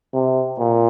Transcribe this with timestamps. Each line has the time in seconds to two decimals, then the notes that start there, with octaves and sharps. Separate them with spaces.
0.13 C3
0.58 A#2